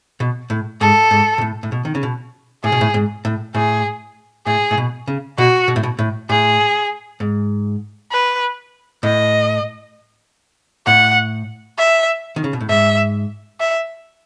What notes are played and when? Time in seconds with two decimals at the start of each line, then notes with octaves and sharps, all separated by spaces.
0.20 B2
0.50 A2
0.81 G#2 A4
1.11 G#2
1.38 B2
1.41 A2
1.63 A2
1.72 B2
1.85 D#3
1.95 C#3
2.03 B2
2.64 A2 G#4
2.72 B2
2.81 A2
2.94 G#2
3.25 A2
3.55 A2 G#4
4.46 A2 G#4
4.71 A2
4.77 B2
5.08 C#3
5.38 B2 F#4
5.68 B2
5.76 A2
5.83 B2
5.99 A2
6.29 A2 G#4
7.20 G#2
8.12 B4
9.03 A2 D#5
10.86 A2 F#5
11.78 E5
12.36 D#3
12.44 C#3
12.53 B2
12.61 A2
12.69 G#2 E5
13.60 E5